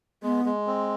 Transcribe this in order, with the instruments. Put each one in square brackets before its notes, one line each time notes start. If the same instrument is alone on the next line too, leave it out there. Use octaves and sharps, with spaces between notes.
[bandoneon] G#3 [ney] B3
[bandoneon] G#3
C4